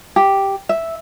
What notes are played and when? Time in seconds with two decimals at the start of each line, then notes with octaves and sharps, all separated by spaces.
0.16 G4
0.69 E5